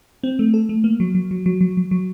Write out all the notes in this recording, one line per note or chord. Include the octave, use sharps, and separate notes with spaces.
C4
A3
A4
A3
A#3
F#3
F#3
F#3
F#3
F#3
F#3
F#3